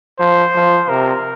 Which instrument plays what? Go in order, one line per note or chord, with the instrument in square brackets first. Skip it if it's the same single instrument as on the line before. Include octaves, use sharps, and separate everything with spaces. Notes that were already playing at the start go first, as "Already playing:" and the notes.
[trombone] F3 [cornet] C5
[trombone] F3
[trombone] C3 [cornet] A#4